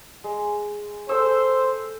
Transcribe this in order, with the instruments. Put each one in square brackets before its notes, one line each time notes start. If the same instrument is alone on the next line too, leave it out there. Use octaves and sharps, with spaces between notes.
[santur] G#3
[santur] A4 E6 [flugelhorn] C5